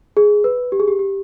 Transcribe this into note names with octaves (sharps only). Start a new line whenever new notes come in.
G#4
B4
G4
G#4
G4
G4